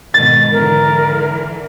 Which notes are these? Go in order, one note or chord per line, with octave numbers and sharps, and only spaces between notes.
G#2 B2 D#3 A6
D3 E3 A#4